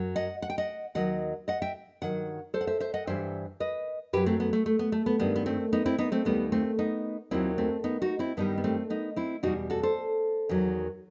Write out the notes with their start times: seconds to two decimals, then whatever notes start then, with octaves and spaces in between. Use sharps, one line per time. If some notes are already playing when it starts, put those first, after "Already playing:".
Already playing: F#2 F#3
0.16 D#5 F#5
0.42 F#5
0.50 G5
0.58 D#5 F#5
0.95 D#2 D#3 F#3 D#5 F#5
1.48 D#5 F#5
1.62 E5 G5
2.01 G2 D#3 F#3 F#5
2.54 A4 C5
2.61 F#5
2.67 C5 E5
2.80 C5 E5
2.94 D#5 F#5
3.07 G2 E3 G3 C5 E5
3.60 B4 D#5
4.13 F#2 F#3 G4 B4
4.26 A3 C4
4.40 B3
4.53 A3
4.66 A3
4.79 B3
4.92 A3
5.06 B3
5.19 G2 D#3 G3 B3
5.36 B3
5.46 A3 C4
5.73 B3 D#4
5.86 C4 E4
5.98 B3 D#4
6.12 A3 C4
6.25 D#2 D#3 G3 B3
6.52 A3 C4
6.79 B3 D#4
7.31 D#2 D#3 F#3 C4 E4
7.58 A3 C4
7.84 B3 D#4
8.02 D#4 F#4
8.19 C4 E4
8.37 G2 D#3 G3 B3 D#4
8.57 B3
8.64 A3 C4
8.90 B3 D#4
9.16 C4 E4
9.43 E2 B2 G3 D#4 F#4
9.70 F#4 A4
9.83 A4 C5
10.49 E2 D#3 F#3